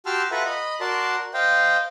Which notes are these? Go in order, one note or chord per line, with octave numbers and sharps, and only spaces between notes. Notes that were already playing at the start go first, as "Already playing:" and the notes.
F#4 G4 A5 C6 E6 F6
F4 A4 B4 E5 F#5 A#5
D#5 B5
F#4 A#4 D5 A5 C6
C5 D#5 F5 G5